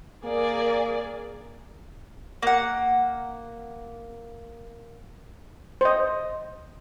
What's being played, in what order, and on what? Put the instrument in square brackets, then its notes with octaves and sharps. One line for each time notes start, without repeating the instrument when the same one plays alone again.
[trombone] A#3 [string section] G#4 A#4 D5
[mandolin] A#3 F#5
[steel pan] C5 D#5